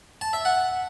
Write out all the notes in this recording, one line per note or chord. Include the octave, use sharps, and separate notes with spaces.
A5
E5
F#5